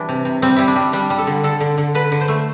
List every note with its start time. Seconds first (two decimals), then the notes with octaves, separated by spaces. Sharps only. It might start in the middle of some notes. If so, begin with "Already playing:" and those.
Already playing: E3 G3 D4
0.09 C3
0.25 C3
0.42 G3 C4
0.56 G3 E4
0.68 D4
0.76 G3
0.93 G3 D4
1.10 G3
1.18 A4
1.27 D3
1.44 D3 A4
1.61 D3
1.78 D3
1.95 D3 B4
2.12 D3
2.21 C5
2.28 A3